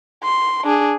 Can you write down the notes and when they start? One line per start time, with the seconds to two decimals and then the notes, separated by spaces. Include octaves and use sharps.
0.23 C6
0.64 D4 G#4